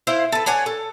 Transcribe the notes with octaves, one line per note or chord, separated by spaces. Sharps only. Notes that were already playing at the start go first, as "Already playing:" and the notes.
E4 C5 F5
A4 B4
D4 C#5 F#5 G#5
A4